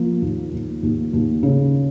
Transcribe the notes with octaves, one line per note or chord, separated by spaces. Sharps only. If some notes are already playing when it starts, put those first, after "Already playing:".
Already playing: F3 A#3
D#2
D#2
D#2
D#2
C#3